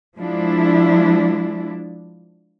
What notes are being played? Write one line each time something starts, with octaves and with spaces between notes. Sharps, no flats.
F3 G#3 D4 E4